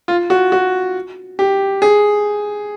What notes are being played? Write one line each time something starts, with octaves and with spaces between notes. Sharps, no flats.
F4
F#4
F#4
G4
G#4